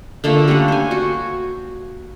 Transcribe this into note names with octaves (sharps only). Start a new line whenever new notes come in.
D3 A3 A#3 F4
G3 C#4 F5 F#5
C5 G#5
F#4